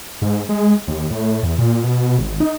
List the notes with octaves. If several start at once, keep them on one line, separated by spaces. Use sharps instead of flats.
G#2
G#3
D#2
A2
E2
A#2
B2
G#1
D#4